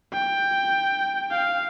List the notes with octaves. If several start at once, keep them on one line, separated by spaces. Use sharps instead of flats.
G5
F5